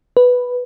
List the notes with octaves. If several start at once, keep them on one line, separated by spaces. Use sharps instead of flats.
B4